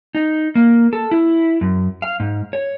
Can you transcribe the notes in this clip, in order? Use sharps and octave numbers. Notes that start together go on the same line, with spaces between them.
D#4
A#3
A4
E4
F#2
F5
G#2
C#5